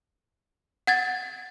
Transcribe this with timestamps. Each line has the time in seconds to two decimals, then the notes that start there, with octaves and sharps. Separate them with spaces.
0.87 F#5 G#6 A6